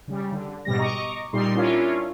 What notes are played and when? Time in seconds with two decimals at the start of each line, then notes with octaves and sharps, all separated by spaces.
0.08 C#3 G3
0.32 D3
0.65 G#2 B2 G3 A#6
0.78 D#5 A#5 C#6 D6
1.33 A#2 G3 D#4 C6
1.54 C#4 D4 E4 F4 A#4 C#5